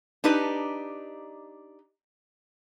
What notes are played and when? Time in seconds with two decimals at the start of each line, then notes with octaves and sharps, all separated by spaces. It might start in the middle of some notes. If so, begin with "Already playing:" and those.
0.24 D4 D#4 G4 B4 D#5